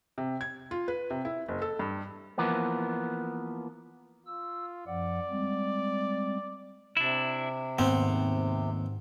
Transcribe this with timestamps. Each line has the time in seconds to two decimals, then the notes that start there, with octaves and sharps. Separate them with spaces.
0.18 C3
0.41 G#6
0.71 F4
0.88 B4
1.10 C3
1.25 E4
1.48 F#1
1.62 A4
1.79 G2
2.38 E3 F3 A#3 B3
4.27 F4 E6
4.87 F#2 F3 D5 F#5
5.30 G3 G#3 C4
6.97 C3 D4 E4
7.79 D#2 G#2 B3 C4